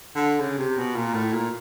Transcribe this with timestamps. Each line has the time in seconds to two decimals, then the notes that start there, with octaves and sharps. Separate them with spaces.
0.15 D3
0.40 C#3
0.58 C3
0.78 B2
0.95 A#2
1.14 A2
1.33 A#2